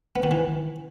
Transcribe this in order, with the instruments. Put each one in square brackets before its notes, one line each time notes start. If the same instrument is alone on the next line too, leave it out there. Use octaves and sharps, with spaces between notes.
[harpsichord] B3
D#3
E3